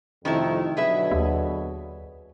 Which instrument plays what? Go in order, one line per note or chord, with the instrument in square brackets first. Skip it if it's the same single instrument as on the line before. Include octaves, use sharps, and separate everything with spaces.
[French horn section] F2 C3 [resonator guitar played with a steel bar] D#3 A3 E4
[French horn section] B2 D3 F#3 [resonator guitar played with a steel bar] G#4 B4 E5
[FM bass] D#2